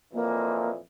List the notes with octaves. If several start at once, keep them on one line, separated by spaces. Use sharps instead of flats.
F2 A#2 E3 A#3